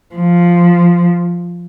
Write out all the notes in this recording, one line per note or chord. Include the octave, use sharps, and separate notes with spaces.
F3